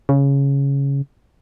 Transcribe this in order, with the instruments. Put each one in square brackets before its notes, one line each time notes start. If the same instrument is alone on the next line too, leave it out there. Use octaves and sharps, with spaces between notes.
[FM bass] C#3